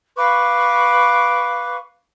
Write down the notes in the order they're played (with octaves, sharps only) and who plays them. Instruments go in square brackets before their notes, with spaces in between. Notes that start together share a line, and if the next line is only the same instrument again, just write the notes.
[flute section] B4 F5 C#6 D6